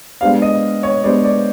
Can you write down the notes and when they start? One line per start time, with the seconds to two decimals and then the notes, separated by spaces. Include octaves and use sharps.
0.21 G#3 B3 D4 G4 C5 F5
0.42 D#5
0.83 C#5
1.03 G#3 B3 D4 G4 C5 D5
1.24 D5